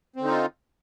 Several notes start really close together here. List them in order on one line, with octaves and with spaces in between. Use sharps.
C4 D3 D#4 F4